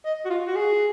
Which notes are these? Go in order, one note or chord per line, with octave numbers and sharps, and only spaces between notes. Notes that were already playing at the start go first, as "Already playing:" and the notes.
D#5
F#4
F4
F#4
G#4